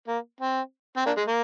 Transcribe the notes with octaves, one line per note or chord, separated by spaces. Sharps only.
A#3
C4
C4
A#3 D4
G#3
A#3